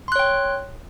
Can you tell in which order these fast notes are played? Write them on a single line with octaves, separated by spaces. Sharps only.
C6 F#6 C#5 G5